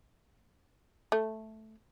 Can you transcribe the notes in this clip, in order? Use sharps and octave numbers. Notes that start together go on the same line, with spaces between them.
A3